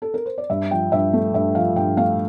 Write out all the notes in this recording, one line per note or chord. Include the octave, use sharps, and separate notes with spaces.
A4
A#4
C5
D5
G2 E5
F3 G5
G2 E5
A3
G2 E5
F3 F5
G2 G5
A3 F5